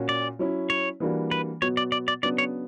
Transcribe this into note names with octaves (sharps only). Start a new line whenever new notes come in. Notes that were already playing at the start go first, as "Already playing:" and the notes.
Already playing: A#2 A#3 C#4 F#4
D5
F#3 C#4 E4
C#5
E3 G3 A#3 D4 F#4
B4
B2 F#3 B3 C#5
D5
D5
D5
C#3 F#3 B3 D4 D5
C#5